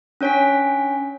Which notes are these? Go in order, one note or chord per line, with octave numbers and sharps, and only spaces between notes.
C#4 D4 C#5 G#5 B6